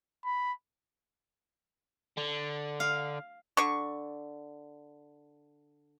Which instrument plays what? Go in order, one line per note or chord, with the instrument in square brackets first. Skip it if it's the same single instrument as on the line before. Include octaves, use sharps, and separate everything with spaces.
[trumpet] B5
[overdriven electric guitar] D3
[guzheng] F5
[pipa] D3 C#6